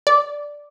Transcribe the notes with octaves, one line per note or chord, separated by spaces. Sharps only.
D5